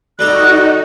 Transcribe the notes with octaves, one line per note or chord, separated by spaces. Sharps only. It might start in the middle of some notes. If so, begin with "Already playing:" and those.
G3 D#4 F#4 A4 A#5 F#6